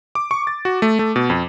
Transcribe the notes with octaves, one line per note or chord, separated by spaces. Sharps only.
D6
C#6
A6
F#4
A3
A3
B2
F2